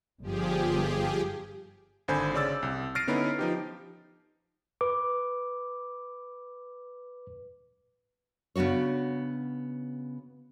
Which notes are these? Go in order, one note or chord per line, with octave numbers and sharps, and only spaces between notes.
G1 F3 G4 G#4
G#1 D3 C5 G#5 B5 G6
C#3 C#4 D5 D6 E6 A6
C2
F6 A6 A#6 C7 D7 D#7
D3 B3 C#4 D#4 E4 B4
F3 D#4 G4
B4 D6
C#3 B3 D4 F#4 C#5